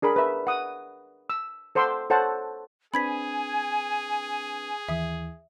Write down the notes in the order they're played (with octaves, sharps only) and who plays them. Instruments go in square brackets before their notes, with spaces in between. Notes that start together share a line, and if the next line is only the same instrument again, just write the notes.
[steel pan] D4 G#4 A#4 B5
B4 E5
F#5 D#6
E6
A4 C5 F#5 C6 D6 E6
A4 C5 C#5 F#5 A5
[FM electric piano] C4 D4 B4 [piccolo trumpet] G#4 [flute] G#5 [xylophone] B5 G#6 B6
[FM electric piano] D#2 E3 [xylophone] E5 D#6